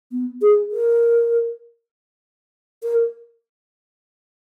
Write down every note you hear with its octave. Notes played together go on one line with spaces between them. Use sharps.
B3
G#4
A#4
A#4